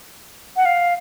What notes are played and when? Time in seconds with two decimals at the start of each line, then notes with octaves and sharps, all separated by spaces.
0.56 F#5
0.65 F5